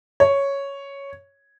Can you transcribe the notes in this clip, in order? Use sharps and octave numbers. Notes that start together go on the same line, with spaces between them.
C#5